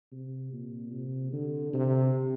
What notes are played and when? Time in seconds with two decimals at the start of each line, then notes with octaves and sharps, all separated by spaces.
0.12 C3
0.53 A#2
0.92 C3
1.33 D3
1.73 C3